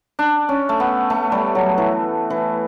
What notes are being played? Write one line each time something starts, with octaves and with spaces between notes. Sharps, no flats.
D4
C#4
A3
B3
A3
G3
F#3
E3
E3